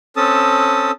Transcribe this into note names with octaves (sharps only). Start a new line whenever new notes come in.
C4 C#4 A4 A5 D#6